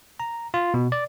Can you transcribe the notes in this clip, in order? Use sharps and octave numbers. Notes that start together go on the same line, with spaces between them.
A#5
F4
B2
D5